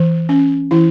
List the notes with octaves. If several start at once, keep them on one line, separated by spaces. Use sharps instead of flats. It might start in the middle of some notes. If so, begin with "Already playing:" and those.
Already playing: E3
C#4
E3 E4